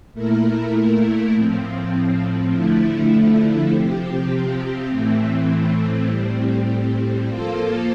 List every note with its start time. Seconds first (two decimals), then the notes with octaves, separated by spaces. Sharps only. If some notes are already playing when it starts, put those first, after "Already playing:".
0.13 A#2 A3 E4 A#4
1.33 A2 F3 C4
2.52 D3 F3 A3 E4
3.70 C3 F3 C4 G4
4.89 A2 E3 A3 C4
6.08 A2 G3 C4
7.27 F3 A#3 F4 A4 C5